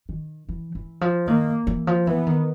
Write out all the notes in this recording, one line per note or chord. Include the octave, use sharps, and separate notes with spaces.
D#3
E3
E3
F3
D#3 A#3
E3
F3
E3 B3
D#3